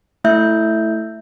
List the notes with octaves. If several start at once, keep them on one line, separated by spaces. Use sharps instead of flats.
A3 E4 E5 G6